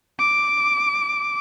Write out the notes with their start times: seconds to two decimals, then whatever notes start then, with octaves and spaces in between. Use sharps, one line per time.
0.19 D6